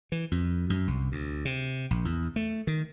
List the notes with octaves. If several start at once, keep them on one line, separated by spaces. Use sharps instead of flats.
E3
F2
F#2
C2
D2
C3
A#1
E2
A3
D#3